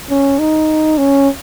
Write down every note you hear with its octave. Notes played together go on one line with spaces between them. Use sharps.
C#4
D#4
C#4